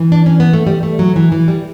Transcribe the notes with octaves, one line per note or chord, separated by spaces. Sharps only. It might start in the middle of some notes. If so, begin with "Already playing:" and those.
Already playing: E3
D4
C#4
B3
A3
G3
A3
F#3
E3
E3
G3